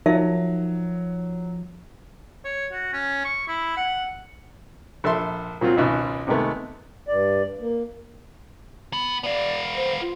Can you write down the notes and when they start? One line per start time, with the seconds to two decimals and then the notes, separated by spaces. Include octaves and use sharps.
0.06 F3 F#3 D#4 A#4 E5
2.45 C#5
2.72 F#4
2.93 C#4
3.25 C#6
3.48 E4
3.77 F#5
5.04 A#1 A4 E5 C6
5.61 A#2 F#3 C4 F4
5.77 G#1 C#2 G#2 B2
6.27 G#2 C3 D#3 G#3 A3 B3
7.08 G2 D5
7.60 A#3
8.93 B3
9.24 B3 D5 F5
9.76 C5
10.01 F4